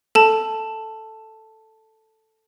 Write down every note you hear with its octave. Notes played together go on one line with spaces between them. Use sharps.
A4 A5